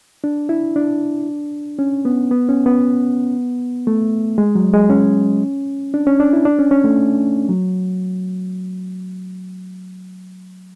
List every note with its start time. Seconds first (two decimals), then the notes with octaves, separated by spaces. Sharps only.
0.24 D4
0.49 E4
0.76 D4
1.79 C#4
2.05 B3
2.31 B3
2.49 C#4
2.66 B3
3.87 A3
4.38 G#3
4.55 F#3
4.73 G#3
4.90 C#4
5.94 D4
6.07 C#4
6.20 D4
6.33 E4
6.45 D4
6.59 C#4
6.71 C#4
6.84 A3
7.49 F#3